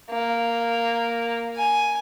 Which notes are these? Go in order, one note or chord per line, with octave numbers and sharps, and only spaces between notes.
A#3
G#5